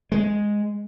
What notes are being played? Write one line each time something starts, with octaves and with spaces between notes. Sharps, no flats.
G#3